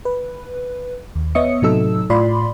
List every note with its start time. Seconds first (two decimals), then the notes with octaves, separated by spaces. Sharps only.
0.05 B4
1.15 D#2
1.35 B3 C#5 D#5 E5 D#6 C#7
1.62 A2 C3 F#3 D#4 A4 E6
2.10 A2 F4 D5 B5 C6